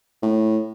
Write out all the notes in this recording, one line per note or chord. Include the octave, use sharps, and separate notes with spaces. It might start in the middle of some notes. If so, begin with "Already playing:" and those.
A2